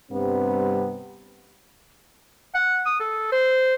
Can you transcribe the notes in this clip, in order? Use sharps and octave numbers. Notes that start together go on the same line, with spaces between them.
G2 C3 G3 B3 C4
F#5
D#6
A4
C5